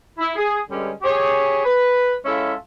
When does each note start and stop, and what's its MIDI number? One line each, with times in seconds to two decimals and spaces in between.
0.18 0.36 64
0.36 0.58 68
0.69 0.90 43
0.69 0.90 50
0.69 0.90 55
0.69 0.90 56
0.69 0.90 61
1.02 1.63 67
1.02 1.63 68
1.02 1.63 73
1.65 2.13 71
2.25 2.53 56
2.25 2.53 61
2.25 2.53 64
2.25 2.53 65
2.25 2.53 69
2.25 2.53 76